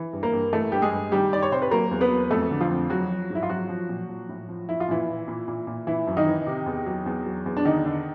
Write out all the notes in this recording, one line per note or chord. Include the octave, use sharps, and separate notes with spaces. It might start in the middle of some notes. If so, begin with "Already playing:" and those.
Already playing: E3
G2
A#3 A#4
G2
E3 A3 A4
G2 G4
G#3 G#4
G2
D#3 G3 G4
D#3 D5
C#5
C3 C5
B4
F#3 A#3 A#4
E2
B3 B4
F#3
F2 A3 A4
D3
F3 F4
F2
F3 F#3 F#4
F3
G#2
E4
F4
F3 F#3 F#4
F3
A#2
F3
A2
F3
F3 E4
F4
A#2 E3 E4
A#2
A#2
A#2
A#2
E3 E4
F#2
D#3 D#4
E3
C3
E2
F#3
E2
F#3
E2
D4
D3 D#3 D#4
D3